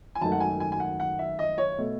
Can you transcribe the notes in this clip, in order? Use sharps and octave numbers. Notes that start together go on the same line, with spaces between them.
G#5
G#1 F#2 D#3 A3 A5
F#5
G#5
G#5
G#5
F#5
F#5
E5
D#5
C#5
B2 A3